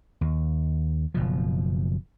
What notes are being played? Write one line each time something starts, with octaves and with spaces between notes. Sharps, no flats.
D#2
F#1 B2 F3